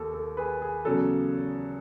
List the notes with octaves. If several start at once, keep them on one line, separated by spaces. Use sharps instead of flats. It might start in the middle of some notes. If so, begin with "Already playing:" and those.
Already playing: D#2 D#3 A4
A4
G#4 B4
G#4
E2 C#3 F#3 A4